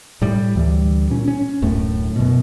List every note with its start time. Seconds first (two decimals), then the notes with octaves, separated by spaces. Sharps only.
0.22 A2 G3
0.55 D2 E3 G3
1.10 A#2 C#4
1.28 C#4
1.62 D1 F#2 A2 A3
2.16 F#2 B2